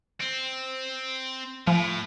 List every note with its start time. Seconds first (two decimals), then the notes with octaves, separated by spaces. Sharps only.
0.20 C4
1.67 A2 F3